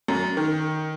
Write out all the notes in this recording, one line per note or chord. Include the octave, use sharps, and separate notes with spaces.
F#2
D#3